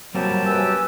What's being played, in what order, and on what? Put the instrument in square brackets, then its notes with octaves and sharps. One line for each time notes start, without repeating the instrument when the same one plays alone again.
[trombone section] F#3 [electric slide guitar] G3 A#3 C4 [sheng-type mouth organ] G4 A5
[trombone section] F#2 [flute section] B4 G#5 E6